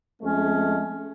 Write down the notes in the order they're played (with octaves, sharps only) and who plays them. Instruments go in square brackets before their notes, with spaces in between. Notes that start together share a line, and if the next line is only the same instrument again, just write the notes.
[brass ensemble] F2 G#3 A3 [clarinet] C#4